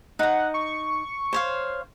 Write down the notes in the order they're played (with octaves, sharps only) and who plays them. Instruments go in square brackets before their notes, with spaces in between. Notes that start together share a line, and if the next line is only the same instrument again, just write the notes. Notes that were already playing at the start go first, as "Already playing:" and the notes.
[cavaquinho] D#4 A#5 [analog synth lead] F#5
[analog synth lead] C#6
[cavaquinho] C5 C#5 F5